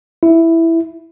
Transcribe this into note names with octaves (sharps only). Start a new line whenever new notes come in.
E4